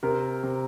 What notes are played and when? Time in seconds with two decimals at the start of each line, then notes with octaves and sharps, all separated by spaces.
0.03 C3 A#4
0.43 C3